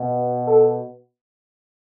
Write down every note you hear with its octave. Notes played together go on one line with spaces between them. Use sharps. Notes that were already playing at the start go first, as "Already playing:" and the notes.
Already playing: B2
A4